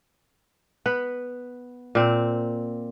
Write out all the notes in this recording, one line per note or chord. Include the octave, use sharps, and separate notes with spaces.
B3 B4
A#2 C4